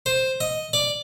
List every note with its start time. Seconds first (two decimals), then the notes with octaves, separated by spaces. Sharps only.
0.06 C5
0.41 D#5
0.73 D5